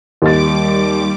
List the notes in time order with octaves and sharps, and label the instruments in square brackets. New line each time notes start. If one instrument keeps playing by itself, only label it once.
[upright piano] D#2 A6 [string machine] G3 D6